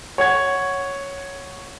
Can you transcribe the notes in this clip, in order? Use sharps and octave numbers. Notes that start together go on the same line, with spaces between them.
C#5 F#5 G#6